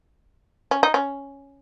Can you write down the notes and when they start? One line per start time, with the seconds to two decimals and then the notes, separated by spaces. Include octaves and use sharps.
0.71 C#4
0.83 D#4
0.94 C#4